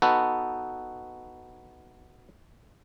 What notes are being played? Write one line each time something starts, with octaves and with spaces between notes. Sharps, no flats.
B3 D#4 F#4 A4 B4